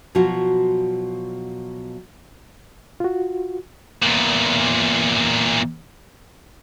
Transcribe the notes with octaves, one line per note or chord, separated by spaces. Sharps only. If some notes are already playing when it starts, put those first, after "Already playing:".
B2 F3 F#3 F4 F#4
F4 F#4
E2 A#2